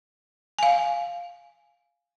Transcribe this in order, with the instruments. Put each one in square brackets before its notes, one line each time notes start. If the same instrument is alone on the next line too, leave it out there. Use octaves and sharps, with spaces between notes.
[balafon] F5 G#5